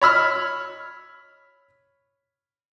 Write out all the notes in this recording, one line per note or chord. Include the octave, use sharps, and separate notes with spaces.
C#5 B5 E6 F6